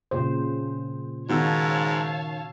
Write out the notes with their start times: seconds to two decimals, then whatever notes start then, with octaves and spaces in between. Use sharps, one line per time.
0.11 A#2 C#3 C5
1.29 G#2 D#3 F#4 C#5 F5 A5 E6